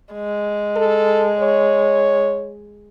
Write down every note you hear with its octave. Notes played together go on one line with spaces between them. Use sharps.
G#3
A4
C#5